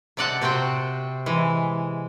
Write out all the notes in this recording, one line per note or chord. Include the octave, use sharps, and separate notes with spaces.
C3 C4 D5 D#5 F#5 A5
C3 C4 F#4 C5 G5
E3 G#3